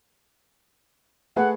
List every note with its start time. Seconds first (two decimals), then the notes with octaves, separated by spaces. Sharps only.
1.36 A3 G#4 B4 F#5